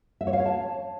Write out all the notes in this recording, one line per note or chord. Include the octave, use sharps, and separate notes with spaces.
E5
C#5
F5
C#5
A5